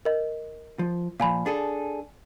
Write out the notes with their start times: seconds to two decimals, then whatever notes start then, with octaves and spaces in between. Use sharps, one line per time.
0.05 A#4 D#5
0.79 F3
1.20 A#2 F3 F5 G#5 B5
1.46 D4 G#4 A4